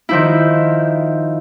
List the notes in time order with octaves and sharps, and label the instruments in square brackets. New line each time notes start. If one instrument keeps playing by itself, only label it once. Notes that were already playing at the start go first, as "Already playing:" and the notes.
[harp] D#3 F3 E4